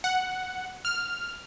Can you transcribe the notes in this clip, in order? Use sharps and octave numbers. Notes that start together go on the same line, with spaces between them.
F#5
F6